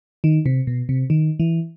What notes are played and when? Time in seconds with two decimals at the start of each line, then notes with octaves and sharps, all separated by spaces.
0.24 D#3
0.46 C3
0.67 B2
0.89 C3
1.10 D#3
1.40 E3